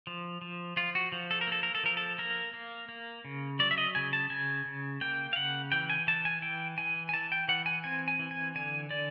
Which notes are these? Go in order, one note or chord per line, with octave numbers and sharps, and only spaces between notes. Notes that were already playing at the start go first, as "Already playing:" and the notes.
F3
F3
F3 F4
F#4
F3
A4
A#4
A#3 A4
A#4
A4
F3 A#4
A4
A#3 A#4
A#3
A#3
C#3
F#3 D5
E5
D#5
C#3 G#5
A5
C#3 G#5
C#3
A#3 G5
F5
C#3 F#5
E3 G5
G#5
E3 A5
G#5
E3 G5
E3 G#5
G#5
E3 A5
G5
E3 F#5
G#5
C4 G#5
G#5
E3
G#5
D3 G#5
D3 D5